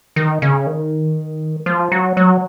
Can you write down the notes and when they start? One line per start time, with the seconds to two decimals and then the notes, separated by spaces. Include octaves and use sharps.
0.16 D#3
0.42 C#3
0.67 D#3
1.66 F3
1.92 F#3
2.17 F#3